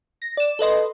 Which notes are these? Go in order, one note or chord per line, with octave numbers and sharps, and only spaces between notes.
A#6
D5 E7
A4 B4 D#5 C6